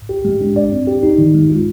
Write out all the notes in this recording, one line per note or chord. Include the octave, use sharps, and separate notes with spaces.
G4
G#3
D4
D5
C4
G4
D#4
D#3
G#3
F4